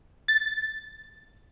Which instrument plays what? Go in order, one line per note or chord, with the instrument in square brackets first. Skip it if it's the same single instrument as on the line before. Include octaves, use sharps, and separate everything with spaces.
[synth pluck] A6